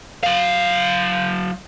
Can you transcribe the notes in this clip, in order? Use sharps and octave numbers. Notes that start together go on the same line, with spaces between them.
F#3 F5